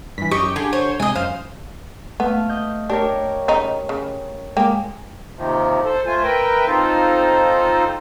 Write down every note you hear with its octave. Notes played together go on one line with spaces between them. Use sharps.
G2 E3 B6
F#2 G4 D#5 C#6
D3 G#4
C5 C#5
C3 G#3 D#5 G#5
F#2 C5 F5
A3 B3 F5
D#5 G6
D4 G4 A#4 C#5
C#3 D#4
C#3
G#3 A#3 G4
D#2 C3 D#3 F3
A4 C5
A3 F4 C5 G#5
A#4 B4 E5 G5
C4 D#4 F4 A4 C5